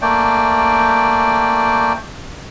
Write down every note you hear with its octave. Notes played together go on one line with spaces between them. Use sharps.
A3 A#3 D5 G5